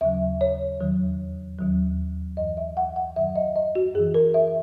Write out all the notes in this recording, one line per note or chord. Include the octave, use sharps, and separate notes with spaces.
D#2 C#3 F#3 E5
C#5
E2 D#3 F#3
D#2 D#3 F#3
F#2 E3 D#5
E5
F#5
F#5
F#2 D#3 F#3 E5
D#5
D#5
F#4
F#2 E3 G#4
A#4
E5